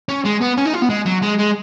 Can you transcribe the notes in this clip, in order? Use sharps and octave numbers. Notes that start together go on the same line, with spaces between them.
C#4
G#3
B3
C#4
D#4
F4
B3
G#3
F#3
G#3
G#3